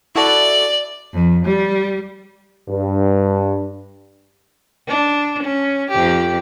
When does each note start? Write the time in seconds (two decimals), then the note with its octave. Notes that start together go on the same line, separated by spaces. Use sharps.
0.15 E4 F#4 A4 D5
1.14 F2
1.45 G3
2.69 G2
4.88 D4
5.43 C#4
5.91 F2 G4